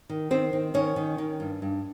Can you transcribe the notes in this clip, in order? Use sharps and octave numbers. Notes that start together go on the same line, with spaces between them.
D#3
D#3 C4 C5
D#3
D#3 C#4 C#5
D#3
D#3
G2
G2